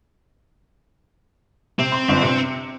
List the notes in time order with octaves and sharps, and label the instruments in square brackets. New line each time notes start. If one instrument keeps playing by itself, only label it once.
[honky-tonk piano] C3 [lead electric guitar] C4
[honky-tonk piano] C6
G1
C3 C#7